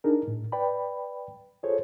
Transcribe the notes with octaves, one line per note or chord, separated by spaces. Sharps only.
D4 D#4 G#4 A#4
A2
B4 D5 G5 B5
F4 G#4 A4 C5 C#5